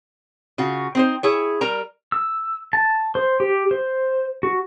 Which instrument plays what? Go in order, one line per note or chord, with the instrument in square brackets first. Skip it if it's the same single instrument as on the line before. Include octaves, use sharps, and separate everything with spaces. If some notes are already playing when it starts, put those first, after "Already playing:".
[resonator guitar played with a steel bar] C#3 F4 F#4
C4 D#4 C5
E4 G#4 C#5
G3 A#4 A#5
[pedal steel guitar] E6
A5
C5
G4
C5
F#4